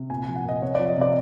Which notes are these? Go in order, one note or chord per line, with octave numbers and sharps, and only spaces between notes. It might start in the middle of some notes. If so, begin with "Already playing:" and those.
Already playing: C3
A#2 G#5
G#5
F3
F#5
A#2 D#5
C3 C#5
F3 D5
D#5
C3 D5